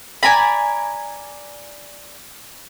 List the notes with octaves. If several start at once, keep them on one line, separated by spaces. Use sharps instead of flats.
D5 G#5 A#5 B5